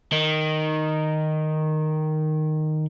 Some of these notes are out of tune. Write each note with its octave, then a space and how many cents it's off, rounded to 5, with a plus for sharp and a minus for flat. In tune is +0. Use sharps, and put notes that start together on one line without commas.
D#3 -5